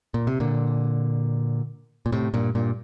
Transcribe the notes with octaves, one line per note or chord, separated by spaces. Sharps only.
A#2
C3
A#2 D3
A#2
A2 C3
G2 A#2
G2 A#2